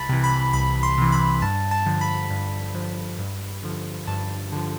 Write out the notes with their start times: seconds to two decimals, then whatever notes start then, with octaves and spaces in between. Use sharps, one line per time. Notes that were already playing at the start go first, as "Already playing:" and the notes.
Already playing: C2 A5 B5
0.09 C3 E3
0.24 B5
0.53 C2 B5
0.83 C6
0.98 C3 E3
1.12 B5
1.42 G2 A5
1.71 A5
1.86 D3 F3
2.01 B5
2.30 G2
2.75 D3 F3
3.19 G2
3.63 D3 F3
4.07 G2 A5
4.52 D3 F3